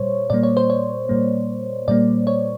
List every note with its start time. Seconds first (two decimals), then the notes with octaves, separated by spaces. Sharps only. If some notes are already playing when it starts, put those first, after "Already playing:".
Already playing: A#2 G3 C5 C#5
0.30 A#2 G3 A#3 D5
0.43 C#5
0.57 C5
0.70 C#5
1.09 A#2 G3 A#3
1.88 A#2 G3 A#3 D5
2.27 C#5